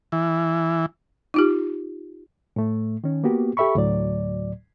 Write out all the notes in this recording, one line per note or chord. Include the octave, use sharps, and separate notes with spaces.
E3
D#4 F4 G4
A2 A3
D#3 C#4
A#3 B3 F#4 G4
G4 A4 E5 B5 C#6
D2 A2 F#3 D5